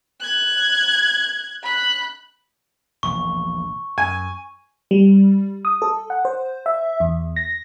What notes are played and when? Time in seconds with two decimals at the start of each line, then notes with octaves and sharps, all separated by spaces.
0.20 F#6 G#6
1.63 B5 F#6
3.03 E1 A#1 C#6
3.98 F#2 G#5
4.91 G3
5.65 D#6
5.82 A4
6.10 F#5
6.25 C5
6.66 E5
7.00 E2
7.36 A#6